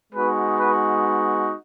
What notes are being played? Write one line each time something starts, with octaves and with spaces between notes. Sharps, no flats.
G#3 B3 D#4 F#4 B4
B4